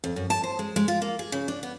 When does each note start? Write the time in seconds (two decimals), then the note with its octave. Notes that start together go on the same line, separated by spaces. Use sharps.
0.04 F2
0.16 F#2
0.30 A5
0.44 C5
0.59 G#3
0.76 G#3
0.88 F4
1.02 A#3
1.19 G#4
1.32 C#3
1.48 D4
1.63 B3